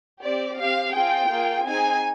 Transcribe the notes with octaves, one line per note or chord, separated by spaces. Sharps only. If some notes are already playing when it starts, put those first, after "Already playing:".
C4 G4 D5
C4 G4 F5
C4 F4 G#4 G5
A#3 F4 G#4
C4 D#4 G#4 G#5